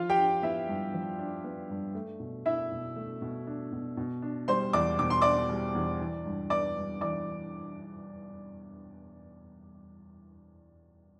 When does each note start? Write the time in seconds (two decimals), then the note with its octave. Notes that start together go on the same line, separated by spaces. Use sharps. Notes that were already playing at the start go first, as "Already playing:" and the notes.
Already playing: F3 F4 F5
0.09 G4 G5
0.18 D4
0.42 B3 E4 E5
0.68 G2
0.94 F3
1.19 D4
1.44 B3
1.70 G2
1.95 A3
2.20 B2
2.46 D4 E4 E5
2.71 B2
2.96 A3
3.22 B2
3.47 D4
3.72 B2
3.97 B2
4.22 D4
4.48 G3 C5 C6
4.73 E2 D5 D6
4.99 B2 D6
5.10 C6
5.22 D4 D5 D6
5.50 G3
5.75 E2
6.00 E3
6.25 G2
6.50 B3 D5 D6
6.76 G2
7.01 E3 D5 D6